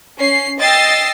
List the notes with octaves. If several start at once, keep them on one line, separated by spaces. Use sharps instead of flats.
C#4 C7
D#5 G5 E6 A6 A#6 C7